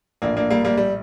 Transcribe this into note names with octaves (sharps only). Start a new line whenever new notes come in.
A#1 A2 A#3 D4
A#3 D4
G3 A#3
G3 A#3
G3